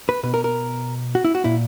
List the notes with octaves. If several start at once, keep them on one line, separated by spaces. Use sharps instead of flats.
B4
B2 B4
A#4
A#4
F#4
E4
F#4
A#2 E4